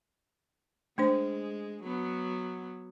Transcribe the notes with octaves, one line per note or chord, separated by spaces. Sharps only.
G#3 A3 D4 C5
F#3 B3